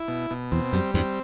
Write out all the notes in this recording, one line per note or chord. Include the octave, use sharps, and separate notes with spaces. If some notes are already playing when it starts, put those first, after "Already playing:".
Already playing: E4
B2
B2
E2 C4
F#2 G3
E2 G2 C4